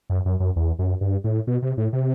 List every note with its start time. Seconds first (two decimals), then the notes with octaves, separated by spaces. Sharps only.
0.10 F#2
0.25 F#2
0.40 F#2
0.56 E2
0.79 F#2
1.01 G2
1.24 A2
1.47 B2
1.62 C3
1.77 A2
1.93 C3